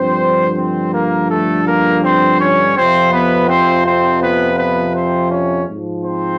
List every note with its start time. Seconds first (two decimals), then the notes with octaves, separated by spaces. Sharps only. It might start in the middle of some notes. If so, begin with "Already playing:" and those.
Already playing: G2 D3 F3 C4 C5
0.57 C4 C5
0.94 A#3 A#4
1.30 A3 A4
1.66 A#3 A#4
2.04 C4 C5
2.40 C#4 C#5
2.76 F2 C3 F3 C4 C5
3.12 B3 B4
3.49 C4 C5
3.85 C4 C5
4.22 B3 B4
4.58 B3 B4
4.94 C4 C5
5.31 C#4 C#5
5.68 G#2 F3
6.04 C4 C5